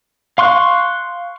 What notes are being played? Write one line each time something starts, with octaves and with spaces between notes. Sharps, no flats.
F5 C6 C#6 F#6